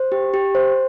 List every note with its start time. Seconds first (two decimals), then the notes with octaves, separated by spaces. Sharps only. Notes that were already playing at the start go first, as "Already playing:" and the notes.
Already playing: C5
0.12 G4
0.34 G4
0.55 C5